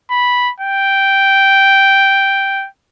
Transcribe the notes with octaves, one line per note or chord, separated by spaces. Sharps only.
B5
G5